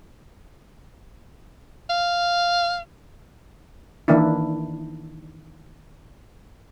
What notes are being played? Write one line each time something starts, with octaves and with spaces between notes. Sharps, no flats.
F5
D#3 E3 A#3 D4 E4